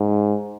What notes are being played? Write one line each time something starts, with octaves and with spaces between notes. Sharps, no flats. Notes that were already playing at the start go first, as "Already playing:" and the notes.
Already playing: G#2